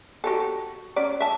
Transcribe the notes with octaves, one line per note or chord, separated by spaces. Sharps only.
F#4 G4 A4
C#4 D5
E5 A5